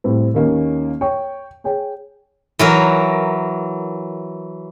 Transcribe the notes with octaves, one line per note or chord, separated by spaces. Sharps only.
A2 G3 C4
D#2 D#3 A#3 C#4
C#5 G5 C#6
G#4 C#5 G5
E3 F#3 A#4